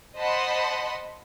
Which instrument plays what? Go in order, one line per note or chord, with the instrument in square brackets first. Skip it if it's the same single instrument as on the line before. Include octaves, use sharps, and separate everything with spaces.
[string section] C5 D#5 F#5 A5 B5 C6